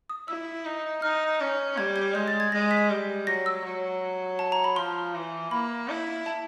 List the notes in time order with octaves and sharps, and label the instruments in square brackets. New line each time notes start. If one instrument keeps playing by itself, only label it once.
[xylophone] D#6
[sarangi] E4 [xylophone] E6
[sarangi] D#4
[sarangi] D#4 [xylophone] F6
[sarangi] C#4
[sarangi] G3 [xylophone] G#6
[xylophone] G#6
[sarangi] G#3 [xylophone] G6
[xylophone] A6
G#6
[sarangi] G#3 [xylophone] A#6
[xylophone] B6
[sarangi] G3
[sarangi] F#3 [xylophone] A#6
[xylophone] E6
[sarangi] F#3
[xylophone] A5
A#5
B5
[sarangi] F3 [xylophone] C6
[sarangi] E3
[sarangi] A#3 [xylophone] B5
[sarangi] E4
[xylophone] A5